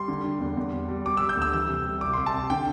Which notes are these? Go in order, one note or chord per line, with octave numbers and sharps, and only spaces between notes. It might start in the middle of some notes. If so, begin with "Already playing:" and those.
Already playing: G3 C6
D3
G3
E2
E2
G3
G3
G3 D6
G3 E6
G6
D2 E6
E3 E6
C3
G3
C2 D6
C2 C6
A5
C3
D3 G5